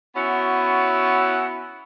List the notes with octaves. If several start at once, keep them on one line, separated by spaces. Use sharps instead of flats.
B3 C#4 E4 F#4